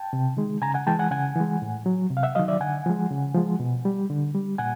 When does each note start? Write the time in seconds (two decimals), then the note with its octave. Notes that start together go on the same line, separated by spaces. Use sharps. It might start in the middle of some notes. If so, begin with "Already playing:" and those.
Already playing: G5 A5
0.13 C3
0.37 D#3 G#3
0.62 C#3 G#5 A#5
0.74 F#5 G#5
0.87 E3 G#3 G5 A5
0.99 F#5 G#5
1.11 C#3 F#5 G#5
1.36 E3 G#3
1.62 A2
1.86 F#3
2.11 C3
2.17 F5
2.23 E5 F#5
2.35 D#3 F#3 D#5 F5
2.48 D5 E5
2.60 D3 F#5 G#5
2.86 F3 G#3
3.11 C#3
3.35 F3 G#3
3.60 B2
3.85 G3
4.10 D3
4.34 G3
4.58 A#2 F#5 G#5